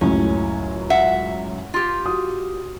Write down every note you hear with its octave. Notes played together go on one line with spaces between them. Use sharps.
C#2 F#2 A2 C#4
E5 F#5
F4 G4
F#4 D#6